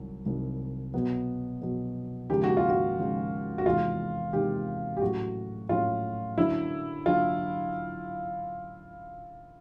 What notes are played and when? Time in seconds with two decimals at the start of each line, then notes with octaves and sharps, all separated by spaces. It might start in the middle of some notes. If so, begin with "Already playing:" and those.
Already playing: C2 C3 D#3 F#3
0.26 C2 C3 D#3 F#3
0.94 B2 F#3 B3
1.62 B2 F#3 B3
2.30 D#2 C#3 F3 G#3 G4
2.44 F#4
2.57 F4
2.69 F#4
2.97 D#2 C#3 F3 G#3
3.58 F#4
3.66 E2 C3 D#3 G#3 F4
4.33 E2 C3 D#3 G#3 G4
4.97 G4
5.01 A2 F#3 A3 C#4 F#4
5.69 A2 F#3 A3 C#4 F4
6.37 F#2 D3 F#3 E4
7.06 D3 F#3 F4